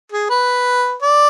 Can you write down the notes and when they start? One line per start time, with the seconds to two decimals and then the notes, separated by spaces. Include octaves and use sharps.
0.12 G#4
0.30 B4
1.02 D5